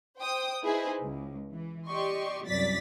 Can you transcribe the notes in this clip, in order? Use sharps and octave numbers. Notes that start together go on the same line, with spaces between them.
C5 G5 D#6
D#4 E4 G#4 B4 C5
C#2
E3
G4 D5 D#5 C6 C#6
C2 F#2 D5 A6 B6